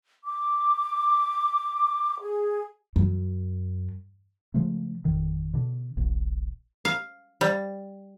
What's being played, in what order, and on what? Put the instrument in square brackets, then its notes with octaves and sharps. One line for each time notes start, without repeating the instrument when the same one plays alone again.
[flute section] D6
G#4
[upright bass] F#2
[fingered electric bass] C#3 F3 G#3 A3
G#1 F2 D3 D#3
B2 D3
D#1 A#1
[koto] F5
G3